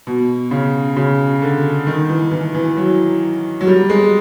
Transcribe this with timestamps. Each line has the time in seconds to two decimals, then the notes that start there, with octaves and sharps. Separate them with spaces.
0.07 B2
0.51 C#3
0.96 C#3
1.42 D3
1.87 D#3
2.09 E3
2.31 E3
2.54 E3
2.77 F#3
3.61 F#3
3.67 G3
3.89 G#3